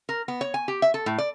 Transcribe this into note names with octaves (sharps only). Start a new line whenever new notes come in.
A#4
B3
C#5
G#5
G4
E5
A4
A2
D5